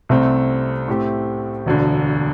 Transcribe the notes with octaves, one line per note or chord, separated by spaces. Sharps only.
C2 C3 A3 C4
A2 A3 C4 G4
E1 D2 D3